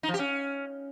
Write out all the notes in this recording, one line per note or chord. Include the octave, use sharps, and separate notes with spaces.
D#4
F3
G4
C#4